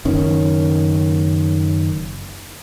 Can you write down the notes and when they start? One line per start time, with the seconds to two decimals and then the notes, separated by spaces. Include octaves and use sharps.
0.05 F#1 D#3 C#4